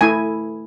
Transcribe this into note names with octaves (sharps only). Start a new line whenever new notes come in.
A3 E4 G#5